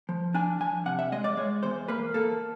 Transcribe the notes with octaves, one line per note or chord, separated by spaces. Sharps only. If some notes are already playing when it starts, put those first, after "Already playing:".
F3
D4 G#5
F3 G#5
C3 F#5
E5
G#3 D#5
D5
G#3 C#5
E2 C5
A#3 B4
A#3 A4